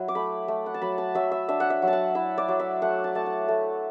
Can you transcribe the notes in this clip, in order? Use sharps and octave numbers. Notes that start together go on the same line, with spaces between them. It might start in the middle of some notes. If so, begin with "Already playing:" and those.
Already playing: F#3 E4 E5 F#5
D6
A3 B5
A3
F#5
A5
F#3 B5
A5
F#3 E5
E5
D4 E5
F#5
E5
F#3
A5
F#5
E4 E5
D5
F#3
E5
A3 F#5
A5
A3 A5
F#5
A3